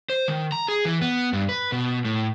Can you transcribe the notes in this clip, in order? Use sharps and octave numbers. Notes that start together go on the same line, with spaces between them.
C5
D#3
A#5
G#4
E3
B3
G2
B4
B2
A2